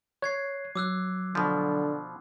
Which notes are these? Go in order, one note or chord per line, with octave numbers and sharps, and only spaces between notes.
C#5 F#6 G#6 C7
F#3 D6 E6 F#6
B2 D3 F3